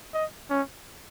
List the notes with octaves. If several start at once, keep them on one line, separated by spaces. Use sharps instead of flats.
D#5
C#4